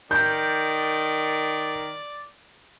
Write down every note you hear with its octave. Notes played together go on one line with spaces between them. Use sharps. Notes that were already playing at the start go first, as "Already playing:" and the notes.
D#3 D5 G6